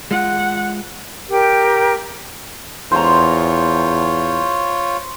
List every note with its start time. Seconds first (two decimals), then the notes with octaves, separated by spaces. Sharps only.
0.11 G#3 F4 F#5
1.29 G4 A#4 G5
2.92 E2 F4 C5 C#5 A#5